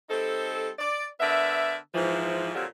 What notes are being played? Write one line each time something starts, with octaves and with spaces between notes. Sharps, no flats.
G3 C4 D#4 A4
D5
D3 B3 A#4 D5 E5
G#2 E3 F3
A#2 D3 F3 F#3 C4 G4